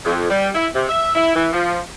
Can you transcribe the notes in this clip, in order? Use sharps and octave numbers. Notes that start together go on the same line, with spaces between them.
F2
G3
E4
C3
E5
E4
E3
F3